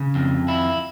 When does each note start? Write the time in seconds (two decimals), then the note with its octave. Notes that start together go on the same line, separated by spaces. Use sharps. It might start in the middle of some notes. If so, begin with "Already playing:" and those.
Already playing: C#3
0.15 F2
0.48 E4